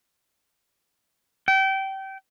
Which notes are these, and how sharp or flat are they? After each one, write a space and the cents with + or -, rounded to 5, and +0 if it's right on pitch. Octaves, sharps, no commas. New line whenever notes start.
G5 -25